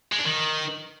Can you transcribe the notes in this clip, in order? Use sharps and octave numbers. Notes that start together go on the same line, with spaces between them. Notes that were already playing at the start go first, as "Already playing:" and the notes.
G#3
D4
D#3